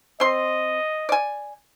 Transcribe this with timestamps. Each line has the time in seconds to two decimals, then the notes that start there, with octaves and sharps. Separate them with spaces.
0.20 C4 D#5 C6
1.09 D5 G#5